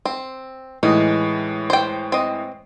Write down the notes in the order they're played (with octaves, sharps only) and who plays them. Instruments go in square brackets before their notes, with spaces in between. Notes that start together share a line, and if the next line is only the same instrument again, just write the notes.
[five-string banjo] C4
[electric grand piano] A2 E3 G#3 [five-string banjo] D#4
[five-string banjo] C5 G5
C4 D#5